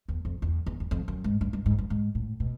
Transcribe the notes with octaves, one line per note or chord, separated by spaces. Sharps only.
E2
F2
E2
E2
E2
F2
F#2
G#2
G2
G2
G#2
G2
G#2
A2
B2